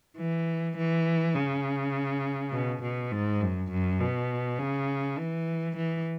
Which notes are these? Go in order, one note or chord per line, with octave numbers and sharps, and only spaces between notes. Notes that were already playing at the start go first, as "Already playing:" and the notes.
E3
E3
C#3
B2
B2
G#2
F#2
F#2
B2
C#3
E3
E3